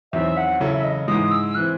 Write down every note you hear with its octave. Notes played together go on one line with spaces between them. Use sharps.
E2 D#3 F#3 C4 E5
F#5
C#3 F#3 C#4 E4 A4
E5
D#5
G#2 E3 G#3 D#6
E6
E3 C4 F#6